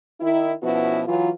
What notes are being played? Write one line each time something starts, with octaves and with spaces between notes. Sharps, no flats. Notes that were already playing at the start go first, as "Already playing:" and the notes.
D#3 E4
B2 F3 B3 C#4 E4 F#4
E3 F#3 F4